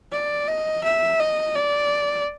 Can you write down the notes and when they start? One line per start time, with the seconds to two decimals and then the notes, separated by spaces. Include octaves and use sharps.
0.12 D5
0.48 D#5
0.84 E5
1.20 D#5
1.55 D5